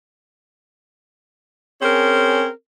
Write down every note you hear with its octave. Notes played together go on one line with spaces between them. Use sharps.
C4 C#4 G#4 A#4